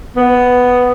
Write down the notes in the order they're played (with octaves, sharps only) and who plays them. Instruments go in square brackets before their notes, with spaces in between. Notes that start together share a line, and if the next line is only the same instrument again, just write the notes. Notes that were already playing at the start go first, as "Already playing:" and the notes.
[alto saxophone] B3